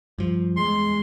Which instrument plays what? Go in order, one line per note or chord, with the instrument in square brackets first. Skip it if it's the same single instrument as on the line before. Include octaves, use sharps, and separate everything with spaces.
[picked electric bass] G2 F3
[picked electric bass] E2 [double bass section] G#3 [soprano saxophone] C6